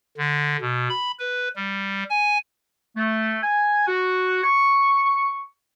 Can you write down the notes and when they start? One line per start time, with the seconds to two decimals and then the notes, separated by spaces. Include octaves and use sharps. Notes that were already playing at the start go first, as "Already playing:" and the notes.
0.17 D3
0.61 B2
0.90 B5
1.19 B4
1.56 G3
2.10 G#5
2.96 A3
3.43 G#5
3.88 F#4
4.44 C#6